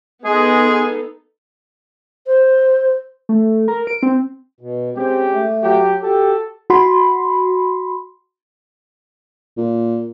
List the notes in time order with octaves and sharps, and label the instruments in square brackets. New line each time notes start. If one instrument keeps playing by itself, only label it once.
[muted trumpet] G#3 [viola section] B3 D#4 A4 [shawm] G#4
[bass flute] C5
[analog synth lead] A3
A#4
D7
C4
[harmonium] B2
[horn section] G#3 C#4 G4 [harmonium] C4
[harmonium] A3
[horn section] F#3 F#4 G4
[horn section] F#4 A4 [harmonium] G4
[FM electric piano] F#4 B5 C6
[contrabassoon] A#2